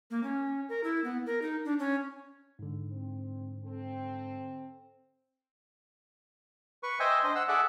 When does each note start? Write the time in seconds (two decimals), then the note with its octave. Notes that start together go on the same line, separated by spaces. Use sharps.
0.11 A#3
0.23 C#4
0.69 A#4
0.84 E4
1.04 B3
1.26 A#4
1.42 D#4
1.65 D4
1.79 C#4
2.59 G#2 D3
2.92 C4
3.64 C4 A4
6.83 B4 C#6
7.00 C5 D#5 E5 G5 G#5
7.23 D4 C5 D#5
7.35 F#5 E6
7.48 G#4 A4 D5 E5 F#5